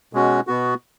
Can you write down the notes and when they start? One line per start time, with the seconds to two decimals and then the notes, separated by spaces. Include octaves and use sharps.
0.13 B2 G#3 C#4 F#4
0.47 B2 B3 F#4